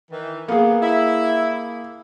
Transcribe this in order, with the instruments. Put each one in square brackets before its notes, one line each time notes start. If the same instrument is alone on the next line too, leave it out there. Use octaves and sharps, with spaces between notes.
[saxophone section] D#3 E3
[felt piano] A#3 G#4 [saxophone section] B3
[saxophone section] E4